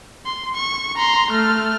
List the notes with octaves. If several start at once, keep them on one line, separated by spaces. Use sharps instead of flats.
C6
C#6
A#5 C6
A3 F6